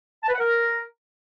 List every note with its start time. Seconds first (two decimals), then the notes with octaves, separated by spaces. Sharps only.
0.23 A5
0.28 B4
0.34 F#5
0.39 A#4